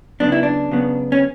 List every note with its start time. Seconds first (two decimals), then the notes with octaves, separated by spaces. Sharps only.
0.20 C#3 F#3 B3 D4
0.32 E4
0.43 D4
0.71 C#3 F#3 B3
1.12 C#4